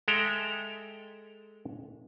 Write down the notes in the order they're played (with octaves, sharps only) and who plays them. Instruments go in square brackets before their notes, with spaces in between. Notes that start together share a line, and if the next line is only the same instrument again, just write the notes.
[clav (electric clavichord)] G#3 A4 E5 G5 A#5